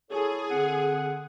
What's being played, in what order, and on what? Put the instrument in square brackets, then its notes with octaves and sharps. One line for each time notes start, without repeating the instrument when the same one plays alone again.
[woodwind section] E4 A4 C#5 [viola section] G#4
[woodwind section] D3 C4 F#5